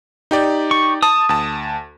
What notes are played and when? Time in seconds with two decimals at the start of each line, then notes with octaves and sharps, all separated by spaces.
0.31 D#4 G4 D5
0.71 C#6
1.02 A5 D#6
1.29 D2 A5